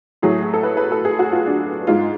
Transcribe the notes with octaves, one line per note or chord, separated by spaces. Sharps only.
A2 F#3 A3 G#4
G#4
A4
B4
B4
A4
G#4
F#4
F4
D4
G#2 G#3 F4